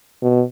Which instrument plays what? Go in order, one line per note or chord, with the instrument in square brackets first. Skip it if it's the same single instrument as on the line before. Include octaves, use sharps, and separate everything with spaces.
[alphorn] B2